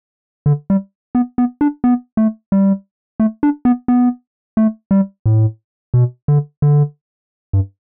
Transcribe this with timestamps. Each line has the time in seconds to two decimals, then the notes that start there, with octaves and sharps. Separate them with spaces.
0.46 D3
0.70 G3
1.15 B3
1.38 B3
1.61 D4
1.84 B3
2.17 A3
2.52 G3
3.20 A3
3.43 D4
3.65 B3
3.88 B3
4.57 A3
4.91 G3
5.26 A2
5.94 B2
6.28 D3
6.62 D3
7.53 G2